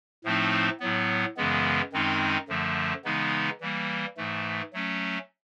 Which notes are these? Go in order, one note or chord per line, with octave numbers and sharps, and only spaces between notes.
A2 F3 A3 C4 D#4
A2 F#3 B3
F#2 C#3 E3 G#3 B3
F#2 D#3 G#3 C4 D#4
F#2 D3 F3 A3
C#3 E3 G#3 B3 D#4
E3 G3 A#3
G#2 E3 A3
F#3 A3 C#4